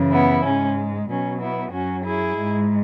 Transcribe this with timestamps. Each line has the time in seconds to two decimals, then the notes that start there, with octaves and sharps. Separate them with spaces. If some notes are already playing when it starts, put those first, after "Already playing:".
Already playing: F#2 C#3 E3
0.12 B3 E4
0.44 G#2 G#3 C#4
1.09 B2 F#3 C#4
1.41 B3 E4
1.73 F#2 F#3 C#4 F#4
2.05 E4 G#4
2.37 G#2 G#3